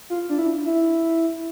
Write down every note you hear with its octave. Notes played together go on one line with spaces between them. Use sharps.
F4
D4
E4
E4